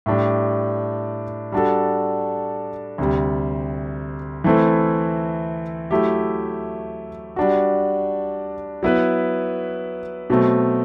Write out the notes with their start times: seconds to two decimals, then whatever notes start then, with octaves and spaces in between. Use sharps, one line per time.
0.06 A2 G3 D4 G4
1.52 G3 D4 F#4 A4
2.98 D2 C3 G3
4.44 E3 A3 C4 E4 A4
5.91 F#3 A3 E4 G4
7.36 G3 D4 F#4
8.83 F#3 B3 E4 B4
10.30 B2 F#3 A3 C4